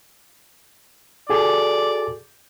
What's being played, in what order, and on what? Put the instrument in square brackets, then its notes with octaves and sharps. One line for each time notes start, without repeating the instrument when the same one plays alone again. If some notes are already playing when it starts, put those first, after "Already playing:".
[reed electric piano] F#4 G#4 A4 [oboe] D5